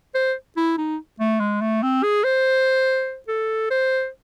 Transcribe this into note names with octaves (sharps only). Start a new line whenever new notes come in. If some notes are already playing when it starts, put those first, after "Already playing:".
C5
E4
D#4
A3
G#3
A3
C4
G#4
C5
A4
C5